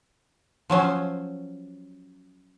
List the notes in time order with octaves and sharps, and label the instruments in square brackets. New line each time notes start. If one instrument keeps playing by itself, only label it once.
[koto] F3 F#3 C#4 C5